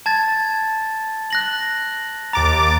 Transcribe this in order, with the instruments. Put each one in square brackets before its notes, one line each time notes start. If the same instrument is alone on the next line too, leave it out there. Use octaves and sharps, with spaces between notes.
[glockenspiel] A5 G#6 A6
F#6 A#6 F#7
[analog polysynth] D#2 D6 A6 [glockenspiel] A#5